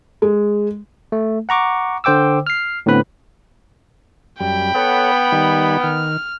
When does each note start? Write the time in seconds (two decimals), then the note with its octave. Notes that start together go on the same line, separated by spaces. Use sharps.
0.22 G#3
1.12 A3
1.49 F#5 A#5 C#6 D6
2.04 D3 C5 G5 D6 E6
2.47 F6 C7
2.86 A2 D3 B3 C4 B4 B5
4.40 F#2 G3 G5 B5
4.75 B3 A4 C#5 F#5
5.32 D#3 G3 D#4
5.83 D#3 F6